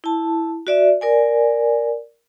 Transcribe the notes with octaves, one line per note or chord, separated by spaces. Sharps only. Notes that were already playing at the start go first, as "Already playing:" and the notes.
E4 A5
F#4 D5 E5
A#4 D5 G#5